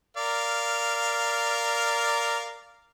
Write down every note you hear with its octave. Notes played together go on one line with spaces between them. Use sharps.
A#4 D5 F5